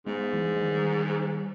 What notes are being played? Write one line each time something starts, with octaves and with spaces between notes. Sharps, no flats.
G#2 G#3 B3
E3 G#3
G#3
D#3 G3